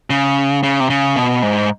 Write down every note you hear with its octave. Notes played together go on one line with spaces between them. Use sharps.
C#3
C#3
C3
C#3
B2
G#2